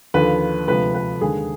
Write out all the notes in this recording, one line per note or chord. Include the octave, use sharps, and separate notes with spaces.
D#2 D3 F3 B4
D2 C3 F3 G#3 B4
B4
D#2 D3 G#3 G#4